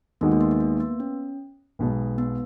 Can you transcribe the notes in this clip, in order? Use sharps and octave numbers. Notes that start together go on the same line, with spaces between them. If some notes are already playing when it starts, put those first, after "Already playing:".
D#2 D#3 G#3 B3 D#4 F#4
A#3
B3
B3
A#3
B3
C#4
B1 B2 G#3
B3